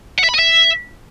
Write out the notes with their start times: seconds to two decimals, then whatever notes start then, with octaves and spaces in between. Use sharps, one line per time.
0.19 F#5
0.24 E5
0.29 B5
0.34 D#5
0.39 E5